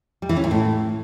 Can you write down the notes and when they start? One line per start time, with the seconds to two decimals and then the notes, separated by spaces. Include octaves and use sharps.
0.22 G3
0.29 E3
0.37 C#4
0.44 A#2
0.51 A2